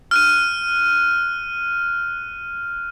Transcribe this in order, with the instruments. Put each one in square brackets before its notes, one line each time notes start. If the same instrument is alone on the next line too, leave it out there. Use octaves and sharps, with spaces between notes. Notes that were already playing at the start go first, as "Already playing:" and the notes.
[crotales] F6 F#6 D#7